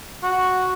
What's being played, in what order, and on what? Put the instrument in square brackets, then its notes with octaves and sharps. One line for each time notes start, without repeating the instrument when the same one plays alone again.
[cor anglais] F#4